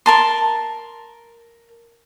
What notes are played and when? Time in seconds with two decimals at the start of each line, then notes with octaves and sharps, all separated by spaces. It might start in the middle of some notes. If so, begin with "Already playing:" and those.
0.06 A#4 A5 C6